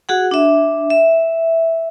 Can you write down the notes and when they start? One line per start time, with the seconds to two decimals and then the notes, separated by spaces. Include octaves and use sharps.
0.09 F#4 G#4 F#5
0.31 D4 E5
0.90 E5